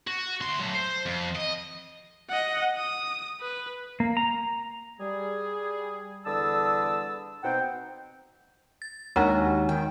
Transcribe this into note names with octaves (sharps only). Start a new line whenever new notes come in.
F#4
D2 C6
F#3 A3
C5
F2
D#5
D#5 F#5
D#6
B4
A#3
A#5
G3 G#4
E2 D3 G3 A5 D#6 E6
B2 C4 D#4 F#5 G5
A6
D#2 G#3 D4 D#4 F#4 A#4 G#5
D#3 G5